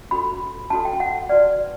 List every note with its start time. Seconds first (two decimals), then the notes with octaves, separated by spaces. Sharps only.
0.11 C#4 F#4 A4 B5
0.70 C#4 F#4 A4 A5
0.85 G5
1.00 F#5
1.29 F#4 B4 D5